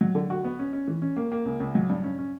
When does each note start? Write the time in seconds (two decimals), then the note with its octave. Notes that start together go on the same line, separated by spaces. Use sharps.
0.01 F#3
0.15 D3
0.30 F#4
0.44 B3
0.59 C#4
0.73 C#4
0.88 E3
1.02 C#4
1.17 A#3
1.32 A#3
1.45 C#2
1.60 C#2
1.75 F#3
1.89 G2
2.04 C#4
2.18 C#4